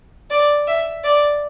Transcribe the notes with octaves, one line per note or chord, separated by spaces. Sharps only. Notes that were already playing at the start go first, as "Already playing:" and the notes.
D5
E5
D5